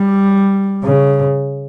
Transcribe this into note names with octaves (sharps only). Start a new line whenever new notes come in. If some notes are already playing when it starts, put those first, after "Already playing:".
Already playing: G3
C#3